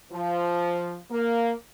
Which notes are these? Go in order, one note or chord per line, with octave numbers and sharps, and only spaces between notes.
F3
A#3